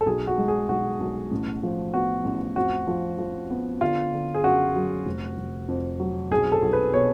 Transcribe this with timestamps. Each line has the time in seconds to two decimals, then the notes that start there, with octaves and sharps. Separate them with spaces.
0.01 A4
0.06 B1 G#4
0.27 F#4
0.38 G#3
0.48 G#4
0.69 B1 F#4
1.00 B1
1.31 A1
1.63 F3
1.94 B3 F#4
2.25 A1
2.56 F2 F#4
2.87 F3
3.19 F3
3.50 B3
3.81 D3 F4
4.13 D3
4.34 G#4
4.43 F#2 F#4
4.76 F#3
5.06 F1
5.38 F1
5.68 F2
6.00 F#3
6.31 B1 G#4
6.52 A4
6.62 B1
6.73 B4
6.93 B2 C#5